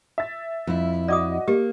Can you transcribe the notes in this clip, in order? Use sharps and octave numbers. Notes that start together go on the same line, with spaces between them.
E5 A6
F2 E4
F#4 D5 D#5 D6 D#6
A#3 G4